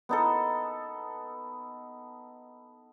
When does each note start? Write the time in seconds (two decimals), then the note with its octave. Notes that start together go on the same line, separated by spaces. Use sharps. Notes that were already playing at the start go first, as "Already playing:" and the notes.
0.09 B3 D#4 A4